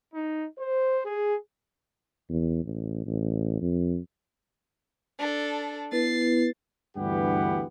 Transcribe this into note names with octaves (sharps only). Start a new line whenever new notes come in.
D#4
C5
G#4
E2
A1
A1
F2
D4 A4
B3 E4 B4 A6 C7
D2 G2 E3 B3 G4 F#5